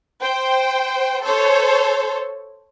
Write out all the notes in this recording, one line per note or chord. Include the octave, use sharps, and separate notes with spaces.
C5 G5
A4 C5 C#5